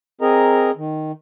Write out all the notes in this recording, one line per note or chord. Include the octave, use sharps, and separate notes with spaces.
C4 G#4 A#4 D#5 A#5
D#3